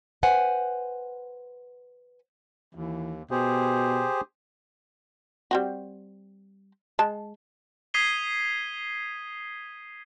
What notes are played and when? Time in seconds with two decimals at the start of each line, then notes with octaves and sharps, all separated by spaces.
0.23 B4 C5 F#5 G#5
2.75 D#2 E3
3.31 B2 G4 G#4 C5
5.51 G3 C4 F#4
6.99 G#3 A5
7.94 D#6 G#6 B6 C7 D#7 G7